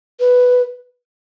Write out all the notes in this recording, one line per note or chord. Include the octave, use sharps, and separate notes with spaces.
B4